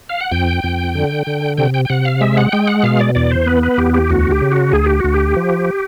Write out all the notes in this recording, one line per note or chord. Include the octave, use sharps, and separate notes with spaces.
F5
F#5
F2 G5
F2
D3
D3
C3 G5
G5
G5
C3 F#5
F5
G#3 E5
F#5
G#3 G5
F#5
B2 F5
D5
E2 D5
C5
B3 B4
B4
E2 G4
G4
D2 F#4
G4
C#3
F#4
D2 G#4
G4
D2 F#4
G4
F3